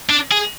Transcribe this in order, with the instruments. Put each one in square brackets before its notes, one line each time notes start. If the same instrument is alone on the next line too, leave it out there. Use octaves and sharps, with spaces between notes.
[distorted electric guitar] D4
G#4